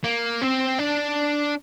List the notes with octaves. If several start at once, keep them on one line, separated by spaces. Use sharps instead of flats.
A#3
C4
D4